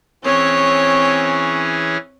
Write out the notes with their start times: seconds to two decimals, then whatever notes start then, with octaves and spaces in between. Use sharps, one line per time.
0.24 E3 C4 C#4 G#4 C#5